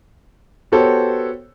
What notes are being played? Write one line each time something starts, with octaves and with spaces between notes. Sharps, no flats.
B3 F#4 G4 A4 C5 C#5